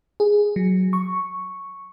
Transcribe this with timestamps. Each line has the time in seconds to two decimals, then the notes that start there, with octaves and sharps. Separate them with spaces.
0.20 G#4
0.56 F#3
0.93 C#6